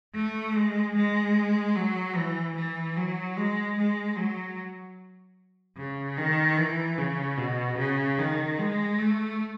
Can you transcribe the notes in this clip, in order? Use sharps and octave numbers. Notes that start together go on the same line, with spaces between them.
A3
G#3
G#3
F#3
E3
E3
F#3
G#3
G#3
F#3
C#3
D#3
E3
C#3
B2
C#3
D#3
G#3
A3